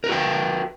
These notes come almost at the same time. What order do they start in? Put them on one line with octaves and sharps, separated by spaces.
A#4 B4 F#4 G5